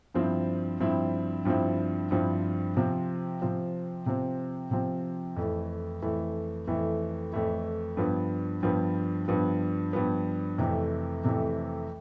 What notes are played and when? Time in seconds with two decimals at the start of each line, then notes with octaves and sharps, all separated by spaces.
0.14 G2 F3 C4 E4
0.80 G2 F3 C4 E4
1.45 G2 F3 C4 E4
2.11 G2 F3 C4 E4
2.76 C3 F3 C4
3.42 C3 F3 C4
4.06 C3 F3 C4
4.71 C3 F3 C4
5.36 F2 E3 A3 E4
6.02 F2 E3 A3 E4
6.67 F2 E3 A3 E4
7.32 F2 E3 A3 E4
7.97 G2 F3 B3
8.63 G2 F3 B3
9.28 G2 F3 B3
9.93 G2 F3 B3
10.58 F2 C3 E3 A3
11.24 F2 C3 E3 A3